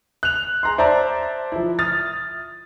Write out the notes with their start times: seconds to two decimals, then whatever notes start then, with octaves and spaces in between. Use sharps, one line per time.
0.23 F#6 F7
0.63 G#4 A#5 C6
0.78 C5 D5 E5 A5 A#5
1.52 F3 E4
1.79 D#6 F6 A6